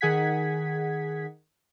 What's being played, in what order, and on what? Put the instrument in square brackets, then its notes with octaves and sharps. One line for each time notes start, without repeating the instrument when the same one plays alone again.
[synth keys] D#3 G#4 F#5 G#6 B6